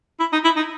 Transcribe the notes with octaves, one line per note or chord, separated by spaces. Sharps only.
E4
D#4
E4
D#4